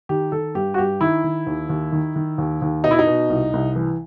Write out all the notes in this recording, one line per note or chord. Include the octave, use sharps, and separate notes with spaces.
D#3 G4
D#3 A4
G2 G4
F#4
G2 G4
D#3 E4
D#3
D#2
D#2
D#3
D#3
D#2
D#2
B2 D#4
E4
D#4
B2
C2
C2
E3